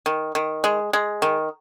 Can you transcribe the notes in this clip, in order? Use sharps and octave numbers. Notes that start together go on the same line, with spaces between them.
D#3
D#3
G#3
G#3
D#3